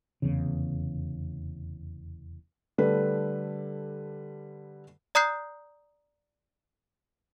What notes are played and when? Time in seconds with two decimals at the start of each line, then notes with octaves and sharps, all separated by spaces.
0.22 F1 E2 C#3
2.78 D3 G3 A3 B4
5.15 D5 A#5 D#6 F#6 G6 C7